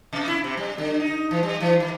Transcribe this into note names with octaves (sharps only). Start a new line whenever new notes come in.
C3
E4
C3
G3
D3
D#4
E3
G3
E3
D#3